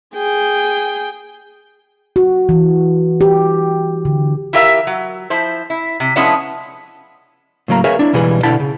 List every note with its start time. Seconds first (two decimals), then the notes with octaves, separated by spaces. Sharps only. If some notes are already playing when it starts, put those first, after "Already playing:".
0.15 G#4 G5
2.16 F#4
2.49 E3
3.21 G4
4.05 D3
4.53 E4 F4 G4 A#4 E5 F5
4.87 F#3
5.30 F3 E4 C5
5.70 E4
6.00 C3
6.16 F3 G#3 B3 C#4 D4 E4
7.68 A2 C#3 F#3 A#3 A#5
7.84 G#4 A#4 B4 C#5 E5 F5
7.99 D4 E4
8.13 C#2 B2 E3 G3 G#4 B4
8.43 B2 D3 E4 G5 A5 B5
8.60 C#3